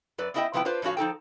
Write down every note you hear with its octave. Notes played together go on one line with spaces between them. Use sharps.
F#2 B4 D5
B3 C#4 E4 D#5 E5 G5
C3 F3 B3 E4 G5
D4 F4 B4 C5
A2 F3 C#4 F#4 F5
F3 D#4 A4 G5